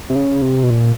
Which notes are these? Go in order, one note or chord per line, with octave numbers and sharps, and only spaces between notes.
C3
C#3
C3
B2
A#2